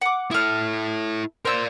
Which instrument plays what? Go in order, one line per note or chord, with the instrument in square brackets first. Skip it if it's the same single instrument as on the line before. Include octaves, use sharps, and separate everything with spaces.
[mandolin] F#5 D6
[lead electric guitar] E4 A4 [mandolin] D#6 F6
[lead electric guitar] A#4 D5 [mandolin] C5 E6